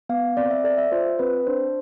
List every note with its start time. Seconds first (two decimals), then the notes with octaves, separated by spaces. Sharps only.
0.09 B3 F5
0.37 C4 D5
0.50 E5
0.64 A4 D5
0.78 E5
0.92 F4 C5
1.19 C4 B4
1.47 D4 C5